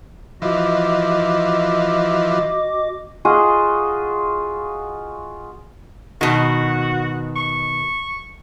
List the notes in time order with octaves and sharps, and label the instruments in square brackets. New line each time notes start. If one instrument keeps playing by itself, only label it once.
[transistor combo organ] E3 F3 [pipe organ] F#4 D#5 D6
[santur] F4 F#4 G#4 D#5
[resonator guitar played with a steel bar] B2 D#3 [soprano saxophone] F#4
[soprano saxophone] C#6